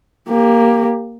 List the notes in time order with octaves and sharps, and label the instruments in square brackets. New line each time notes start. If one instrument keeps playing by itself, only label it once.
[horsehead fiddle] A#3 G4